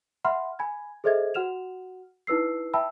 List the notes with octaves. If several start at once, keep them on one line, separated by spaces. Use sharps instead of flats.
E5 F#5 B5 C6 F6
G#5 B5 G#6
G#4 A4 C5 D#5 E5 G#6
F#4 F#5 F6 E7 F7
D#4 E4 B4 E6 C7
E5 G5 A5 B5 E6